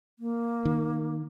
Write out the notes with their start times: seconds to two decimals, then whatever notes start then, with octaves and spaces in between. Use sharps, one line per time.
0.19 A#3
0.65 D#3